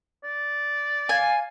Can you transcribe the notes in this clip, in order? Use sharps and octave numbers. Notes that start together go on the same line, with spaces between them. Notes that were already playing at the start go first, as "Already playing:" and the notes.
D5
F5 G#5